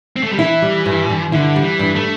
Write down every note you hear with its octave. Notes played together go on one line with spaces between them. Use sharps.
C4
A3
G3
E3 E4
G3
G2
G2
D3 E4
G3
E3
G2
A3